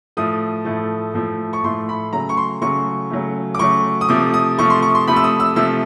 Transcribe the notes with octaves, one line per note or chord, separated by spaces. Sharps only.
A2 F3 A3 D#6
A2 F3 A3
A2 F3 A3
C#6
A2 F3 A3 C6
B5
C#3 F#3 A3 A#5
C#6
C6
C#3 F#3 A3 C#6
C#3 F#3 A3
D6
C#3 F#3 A3 C#6
D#6
C3 F3 A3 D6
D#6
C3 F3 A3 C#6
C6
C#6
C6
C3 F3 A3 B5
E6
D#6
E6
C3 F3 A3 E6